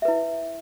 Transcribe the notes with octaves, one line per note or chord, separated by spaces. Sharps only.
E4 B4 E5